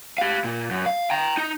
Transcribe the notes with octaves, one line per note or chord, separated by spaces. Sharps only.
G4 F5
A#2
F#2
F5
G5 A#5
D#4